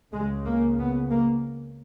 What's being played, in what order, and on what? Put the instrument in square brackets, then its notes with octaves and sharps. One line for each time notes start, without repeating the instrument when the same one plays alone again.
[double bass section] C#2 C#3 G#3
A#3
B3
A#3